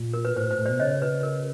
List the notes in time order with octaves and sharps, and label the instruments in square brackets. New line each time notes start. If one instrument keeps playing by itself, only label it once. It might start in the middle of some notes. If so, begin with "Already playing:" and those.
Already playing: [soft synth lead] A#2
[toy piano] A#4
B4
[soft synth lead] A2 [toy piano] C5
[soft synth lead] A2
[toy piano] C5
[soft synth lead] A2
[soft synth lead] B2 [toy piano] C5 D5
[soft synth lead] C#3 [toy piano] C#5 D#5
[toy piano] B4
A#4